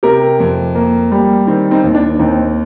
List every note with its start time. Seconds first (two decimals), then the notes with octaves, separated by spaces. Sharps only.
0.03 C3 G4 A#4
0.40 F2
0.75 A#3
1.12 G3
1.47 D#3 C4
1.71 C4 D#4
1.84 D#2
1.95 D4
2.19 D#2 C4 D#4